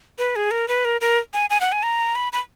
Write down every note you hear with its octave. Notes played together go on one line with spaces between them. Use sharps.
B4
G#4
A#4
B4
A#4
A#4
G#5
G#5
F#5
G#5
A#5
B5
B5